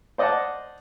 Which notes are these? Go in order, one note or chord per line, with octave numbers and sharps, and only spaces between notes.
C5 D5 D#5 F#5 A5